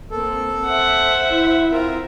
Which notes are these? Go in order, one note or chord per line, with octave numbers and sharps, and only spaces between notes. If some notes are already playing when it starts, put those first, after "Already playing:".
A#3 C4 A4
C5 E5 F#5
E4
C4 F4 A#4